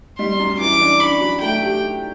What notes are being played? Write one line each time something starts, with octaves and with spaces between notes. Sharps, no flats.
G3 C6
F#2
E3 D6
D4
D4 B5
F#3
A3 G5
G4